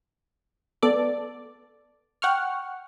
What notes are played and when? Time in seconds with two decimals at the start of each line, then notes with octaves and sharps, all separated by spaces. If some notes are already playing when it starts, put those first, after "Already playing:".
0.83 B3 A4 D5
2.22 F#5 G5 C#6 F6